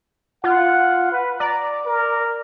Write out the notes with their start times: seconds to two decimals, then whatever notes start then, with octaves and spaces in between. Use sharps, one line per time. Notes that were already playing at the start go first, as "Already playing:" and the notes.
0.44 F4 F#5
1.12 B4
1.40 D5 A#5
1.86 A#4